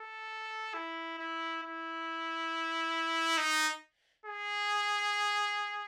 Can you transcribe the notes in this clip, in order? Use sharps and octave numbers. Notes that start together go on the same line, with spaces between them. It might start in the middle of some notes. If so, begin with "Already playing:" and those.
Already playing: A4
E4
E4
E4
D#4
G#4